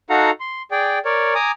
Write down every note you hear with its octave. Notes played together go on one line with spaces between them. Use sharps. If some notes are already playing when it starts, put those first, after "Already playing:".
D#4 F#4 A4 F5 F#5 A#5
C6
G#4 D5 G5
A#4 C#5 D5
G#5 A#5 D6 D#6